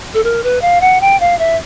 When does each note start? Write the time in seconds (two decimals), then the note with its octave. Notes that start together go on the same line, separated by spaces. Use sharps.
0.14 A4
0.24 A#4
0.43 B4
0.62 F5
0.81 F#5
1.01 G5
1.20 F5
1.39 E5